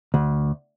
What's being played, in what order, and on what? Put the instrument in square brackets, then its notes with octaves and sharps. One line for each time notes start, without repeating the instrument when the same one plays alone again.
[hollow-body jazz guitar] D2